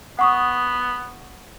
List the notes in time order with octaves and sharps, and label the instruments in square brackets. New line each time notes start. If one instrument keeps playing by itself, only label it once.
[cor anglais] B3 [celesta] F#5 C#6 D#6